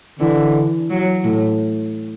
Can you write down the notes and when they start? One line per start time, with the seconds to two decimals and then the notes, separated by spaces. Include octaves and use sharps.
0.19 D3 E3
0.90 F#3
1.24 A2